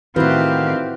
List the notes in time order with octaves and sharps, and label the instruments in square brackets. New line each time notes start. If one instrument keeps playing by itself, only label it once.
[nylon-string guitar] A2 D#3 [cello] C4 G4 [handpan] E4 F#4 B4 [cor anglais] F5